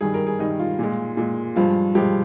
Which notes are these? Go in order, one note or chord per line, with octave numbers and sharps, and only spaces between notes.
G2 D#3 G3 G#4
A#4
G#4
G2 D#3 G3 D#4
F4
A#2 G#3
A#2 G#3
G2 F3 G#3 F4
G2 F3 G#3 G4